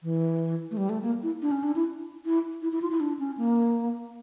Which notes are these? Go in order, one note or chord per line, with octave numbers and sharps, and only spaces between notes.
E3
A3
G3
A3
A#3
E4
D4
C#4
D4
E4
E4
E4
E4
F4
E4
D4
C#4
A#3